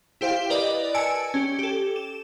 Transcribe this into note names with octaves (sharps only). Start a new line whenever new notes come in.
E4 G4 C5 F5 G5
A#4 B4 D5 D#5
G#5 A5 E6 C#7 D7
C#4 G4
G4 A4
E7